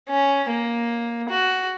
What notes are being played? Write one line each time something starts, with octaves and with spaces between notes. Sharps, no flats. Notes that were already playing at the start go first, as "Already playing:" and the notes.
C#4
A#3
F#4